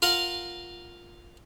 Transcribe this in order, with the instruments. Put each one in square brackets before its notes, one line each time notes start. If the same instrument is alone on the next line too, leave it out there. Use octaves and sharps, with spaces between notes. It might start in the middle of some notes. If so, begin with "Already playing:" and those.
[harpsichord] F4 A#4 F5 F#5